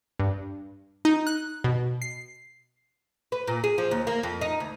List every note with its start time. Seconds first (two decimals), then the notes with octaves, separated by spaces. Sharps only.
0.19 G2
1.05 D#4
1.27 F#6
1.64 B2
2.02 C7
3.32 B4
3.48 A#2
3.64 G#4
3.78 F3
3.91 D#2
4.07 A#3
4.23 F2
4.41 D#4
4.60 D2